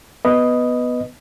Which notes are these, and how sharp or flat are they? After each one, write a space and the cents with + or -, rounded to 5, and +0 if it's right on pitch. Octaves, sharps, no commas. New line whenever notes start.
B3 +0 B4 +0 D#5 +0